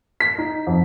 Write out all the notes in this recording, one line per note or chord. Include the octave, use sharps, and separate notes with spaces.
B6
D#4
F2